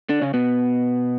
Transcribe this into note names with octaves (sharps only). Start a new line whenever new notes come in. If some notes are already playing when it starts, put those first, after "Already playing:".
D3 D4
C#3 C#4
B2 B3